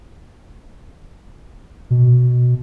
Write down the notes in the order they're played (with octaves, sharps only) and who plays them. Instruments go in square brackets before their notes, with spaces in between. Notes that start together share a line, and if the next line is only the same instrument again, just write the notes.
[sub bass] B2